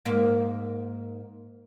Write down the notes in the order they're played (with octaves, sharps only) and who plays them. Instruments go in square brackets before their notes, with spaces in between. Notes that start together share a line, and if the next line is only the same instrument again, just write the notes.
[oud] G#2 A#3